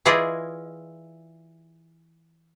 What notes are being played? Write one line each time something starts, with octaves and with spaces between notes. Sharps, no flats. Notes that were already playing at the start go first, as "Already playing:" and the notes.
E3 E4 F4 G#4 D5 D#5